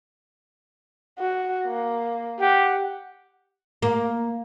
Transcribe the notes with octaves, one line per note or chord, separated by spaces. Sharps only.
F#4
A#3
G4 F#5
A#3